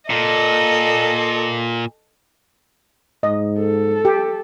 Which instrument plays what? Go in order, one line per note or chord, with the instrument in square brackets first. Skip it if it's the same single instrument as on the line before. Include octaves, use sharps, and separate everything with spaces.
[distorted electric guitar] A#2 [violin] A4 D#5
[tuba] G#2 [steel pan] D#5
[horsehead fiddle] A4
[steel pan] G4